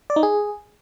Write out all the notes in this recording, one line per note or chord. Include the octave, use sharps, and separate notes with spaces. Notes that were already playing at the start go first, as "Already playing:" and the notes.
D5
D#4
G#4